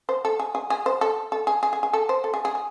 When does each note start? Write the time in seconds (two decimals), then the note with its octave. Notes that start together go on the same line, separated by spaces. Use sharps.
0.09 C5
0.25 A4
0.39 G#4
0.55 G#4
0.70 G#4
0.86 C5
1.01 A4
1.32 A4
1.47 G#4
1.63 G#4
1.73 G#4
1.83 G#4
1.93 A4
2.09 C5
2.24 A4
2.34 G#4
2.45 G#4
2.55 G#4